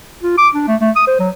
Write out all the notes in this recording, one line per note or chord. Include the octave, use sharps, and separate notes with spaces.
F4
D6
D4
A3
A3
D#6
C5
F#3